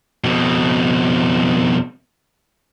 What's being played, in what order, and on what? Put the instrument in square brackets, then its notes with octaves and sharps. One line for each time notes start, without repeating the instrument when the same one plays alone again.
[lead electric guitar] F2 B2